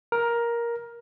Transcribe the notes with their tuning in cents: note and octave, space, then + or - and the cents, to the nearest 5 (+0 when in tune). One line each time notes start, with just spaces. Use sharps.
A#4 +10